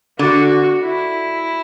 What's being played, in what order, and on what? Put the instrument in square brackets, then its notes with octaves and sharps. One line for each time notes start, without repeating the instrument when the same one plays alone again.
[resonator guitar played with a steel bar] D3 [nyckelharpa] F#4
[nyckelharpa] E4